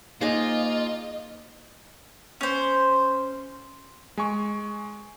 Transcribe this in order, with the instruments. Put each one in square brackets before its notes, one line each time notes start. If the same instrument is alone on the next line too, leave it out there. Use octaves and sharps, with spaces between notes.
[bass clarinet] A#3 [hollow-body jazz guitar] D#4 G#4 C5 [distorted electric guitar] F4 [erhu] D#5
[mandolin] C#4 C5
[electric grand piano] G#3 G#5 C#6